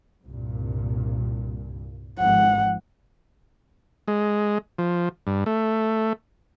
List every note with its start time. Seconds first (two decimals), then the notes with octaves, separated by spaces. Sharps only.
0.24 C2 G2 A#2
2.19 G#1 G#2 F3 F#5
4.08 G#3
4.78 F3
5.27 G2
5.46 A3